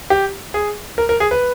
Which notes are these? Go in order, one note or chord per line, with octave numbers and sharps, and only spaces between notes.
G4
G#4
A#4
A#4
G#4
B4